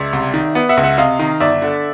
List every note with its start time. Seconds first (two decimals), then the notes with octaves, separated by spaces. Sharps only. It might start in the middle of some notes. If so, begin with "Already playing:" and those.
Already playing: C#2 D5 E5
0.13 C2
0.34 D#3
0.55 B3
0.69 E5 F#5
0.77 C#2
0.83 E5 F#5
0.98 C3 D#5 F5
1.19 D#3
1.40 G1 D5 E5
1.62 D3